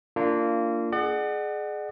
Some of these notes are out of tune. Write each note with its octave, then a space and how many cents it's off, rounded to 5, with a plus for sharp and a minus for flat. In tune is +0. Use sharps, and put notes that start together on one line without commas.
A#3 -20 D4 +0 F4 -25
G#4 +20 D5 +45 F#5 +15